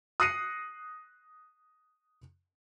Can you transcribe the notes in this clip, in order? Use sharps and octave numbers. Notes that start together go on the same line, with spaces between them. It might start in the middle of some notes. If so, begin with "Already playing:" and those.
D#6 F#6 A#6 C7 C#7 D#7